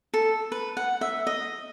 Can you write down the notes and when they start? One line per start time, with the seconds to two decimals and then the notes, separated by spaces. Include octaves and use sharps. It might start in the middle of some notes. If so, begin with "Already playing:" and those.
0.14 A4
0.52 B4
0.77 F#5
1.01 E5
1.27 D#5